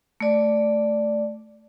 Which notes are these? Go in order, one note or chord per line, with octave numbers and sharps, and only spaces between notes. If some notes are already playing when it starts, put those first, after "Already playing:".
A3 D5